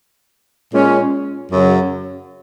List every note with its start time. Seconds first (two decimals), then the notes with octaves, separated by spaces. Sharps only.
0.72 A#2 G#3 C#4
1.51 F#2 C#3 F#3